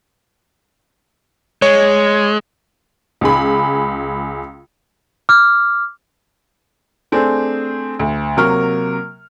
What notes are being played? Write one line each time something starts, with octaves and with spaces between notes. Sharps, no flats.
G#3 C#5
C#2 G#4 B5
D6 F6
A3 C4 D4 G#4
D2
C3 F#3 A#3 A#4 C#6 F6